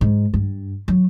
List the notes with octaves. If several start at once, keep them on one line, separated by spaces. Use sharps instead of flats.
G#2
G2
F#3